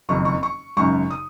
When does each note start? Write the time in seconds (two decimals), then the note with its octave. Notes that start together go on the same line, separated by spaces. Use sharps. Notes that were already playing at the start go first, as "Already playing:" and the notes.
0.09 F#1 F2 D#3 C#6
0.25 C#6
0.43 C#6
0.77 G#1 F#2 C#3 C#6
1.10 D#6